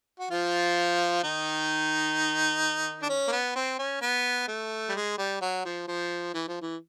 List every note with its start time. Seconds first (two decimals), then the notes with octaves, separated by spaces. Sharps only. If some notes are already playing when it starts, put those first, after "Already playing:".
0.19 F#4
0.31 F3 F4
1.23 D#3 D#4
3.02 D4
3.09 C#4
3.28 A#3
3.32 B3
3.56 C4
3.79 C#4
4.02 B3
4.48 A3
4.89 G3
4.95 G#3
5.18 G3
5.41 F#3
5.65 F3
5.88 F3
6.34 E3
6.48 F3
6.62 E3